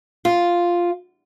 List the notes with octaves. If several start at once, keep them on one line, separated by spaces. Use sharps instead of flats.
F4